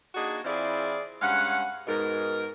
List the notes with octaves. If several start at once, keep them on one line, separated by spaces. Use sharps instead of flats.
A#3 D4 D#4 F#4 G#4
E3 C4 E4 F4 G#4 D5
G2 G#3 C#4 F5 F#5
G#2 B2 A#4